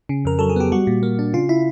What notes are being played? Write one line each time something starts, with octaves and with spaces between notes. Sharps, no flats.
C#3
F2 A#4
F#3 A4
G#4
B3 G4
G3 F#4
A#2
A#3
D4
C#3 F4
E4